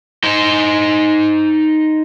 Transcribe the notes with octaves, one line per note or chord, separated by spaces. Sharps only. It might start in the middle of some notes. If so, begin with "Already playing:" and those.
D#4 C5